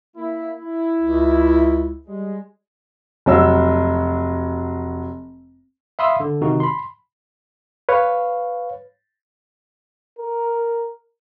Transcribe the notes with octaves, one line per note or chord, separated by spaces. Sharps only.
A#3 E4
E4
C#2
G3 G#3
F1 F#3 E6
E5 F5 B5 C6 D#6 E6
D3
C3 D#3 D#4 F#4
B5 C6
B4 C#5 F5
A#4